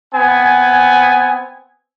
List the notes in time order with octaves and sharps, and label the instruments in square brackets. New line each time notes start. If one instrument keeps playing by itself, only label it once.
[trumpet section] B3 C4 G#5